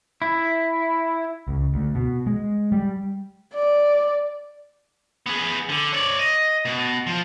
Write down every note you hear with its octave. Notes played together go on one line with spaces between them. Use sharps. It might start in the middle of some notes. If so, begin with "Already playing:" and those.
E4
C#2
D2
B2
G#3
G3
D5
B3 G#4
D3
C#5 D5
D#5
B2
F3